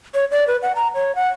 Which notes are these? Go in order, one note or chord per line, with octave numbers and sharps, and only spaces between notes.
C#5
D5
B4
F#5
A#5
C#5
F#5